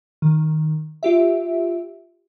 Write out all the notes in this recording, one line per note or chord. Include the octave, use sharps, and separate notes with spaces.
D#3
F4 G4 E5